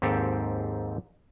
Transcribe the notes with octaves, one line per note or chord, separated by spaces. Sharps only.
D#2 G#2 C4 G4 A4